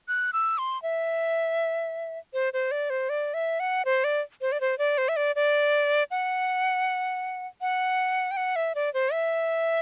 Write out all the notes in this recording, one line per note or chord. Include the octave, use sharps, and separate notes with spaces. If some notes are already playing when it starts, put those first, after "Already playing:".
F#6
E6
C6
E5
C5
C5
D5
C5
D5
E5
F#5
C5
D5
C5
D5
C5
D5
C5
E5
D5
D5
F#5
F#5
G5
F#5
E5
D5
C5
E5